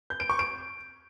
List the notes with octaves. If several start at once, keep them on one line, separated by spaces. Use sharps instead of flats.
G6
D7
C#6
D7